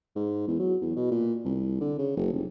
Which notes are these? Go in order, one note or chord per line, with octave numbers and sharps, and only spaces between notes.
G#2
E2
F#3
E2
B2
A#2
C2
D3
C#3
F#1
F1